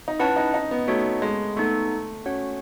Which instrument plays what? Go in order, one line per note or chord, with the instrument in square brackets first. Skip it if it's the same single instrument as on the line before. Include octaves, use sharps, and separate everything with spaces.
[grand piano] D#4
[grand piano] C#4 [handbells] E4 B4 F#5 A5
[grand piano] D#4
D#4
B3
[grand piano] A3 [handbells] D#4 F#4 C#5
[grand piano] G#3
[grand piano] A3 [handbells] B3 D#4 A4
[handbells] C#4 F#4 C#5 F#5